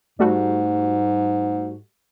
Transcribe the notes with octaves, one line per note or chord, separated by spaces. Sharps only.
G#2 G3 A3 F#4